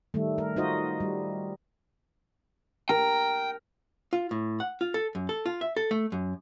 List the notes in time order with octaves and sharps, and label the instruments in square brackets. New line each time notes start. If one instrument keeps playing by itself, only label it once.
[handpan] D#3 G3 A3
A#4
D#4 F4 F#4 C5 D#5
G3
[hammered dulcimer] A#4 [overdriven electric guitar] G5
[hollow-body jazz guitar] F4
A2
F#5
F4
A4
F#2
A4
F4
E5
A4
A3
F#2